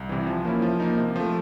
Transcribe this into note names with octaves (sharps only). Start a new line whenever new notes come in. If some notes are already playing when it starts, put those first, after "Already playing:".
Already playing: C2
C3 E3
F3
A#3 C#4 E4
F3
A#3 D#4
C3
F3 A3